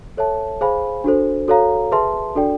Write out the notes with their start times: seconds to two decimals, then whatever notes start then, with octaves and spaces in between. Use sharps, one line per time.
0.17 A4 C#5 E5 A5
0.61 G#4 C5 F5 G#5 B5
1.04 D4 F#4 A4 C5
1.48 F#4 A4 C#5 F5 A#5
1.91 G#4 B4 E5 A5 C6
2.35 D4 F#4 A4 D5 G5